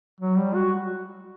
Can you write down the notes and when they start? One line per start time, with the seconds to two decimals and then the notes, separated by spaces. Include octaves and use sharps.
0.20 F#3
0.37 G3
0.54 F#4